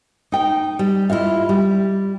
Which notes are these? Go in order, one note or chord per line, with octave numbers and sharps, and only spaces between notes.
D#4 G5
G3
E4 F4 D#5 F5
G3